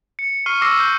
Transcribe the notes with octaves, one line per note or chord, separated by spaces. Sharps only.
C#7
C#6 F6 C7 D#7 G7
C#6 D6 E6 A#6 C7
G6